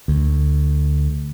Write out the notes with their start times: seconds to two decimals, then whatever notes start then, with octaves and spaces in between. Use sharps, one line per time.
0.08 D2